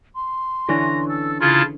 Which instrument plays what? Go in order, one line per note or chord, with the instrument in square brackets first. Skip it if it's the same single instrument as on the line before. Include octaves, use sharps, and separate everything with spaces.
[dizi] C6
[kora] D3 E3 C#4 [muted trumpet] A#5
[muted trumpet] A4 [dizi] E6
[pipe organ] C#3 E4 F4 [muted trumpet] A5 [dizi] F6